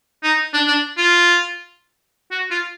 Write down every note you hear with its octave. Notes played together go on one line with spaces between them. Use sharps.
D#4
D4
D4
F4
F#4
F4